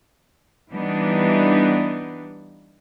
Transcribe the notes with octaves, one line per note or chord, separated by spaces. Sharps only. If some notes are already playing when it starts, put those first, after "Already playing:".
E3 G3 B3 D4 D#4